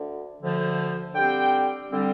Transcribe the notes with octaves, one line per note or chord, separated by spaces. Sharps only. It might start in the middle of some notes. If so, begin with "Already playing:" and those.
Already playing: D2 D3
D2 D3 F3
D3 G3 C4 G5
D3 G3 C4